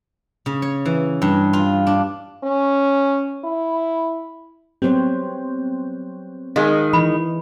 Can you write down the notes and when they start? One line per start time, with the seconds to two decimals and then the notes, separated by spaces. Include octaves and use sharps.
0.46 C#3
0.62 C#5
0.86 E3
1.22 G2
1.53 F4
1.87 D4
2.44 C#4
3.45 E4
4.82 F#3 B3 C4 G4 C5 C#5
6.56 D#3 G#3 F5
6.93 E3 B5